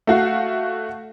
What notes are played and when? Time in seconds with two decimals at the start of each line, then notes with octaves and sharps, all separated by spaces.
0.07 A3 F#4 F5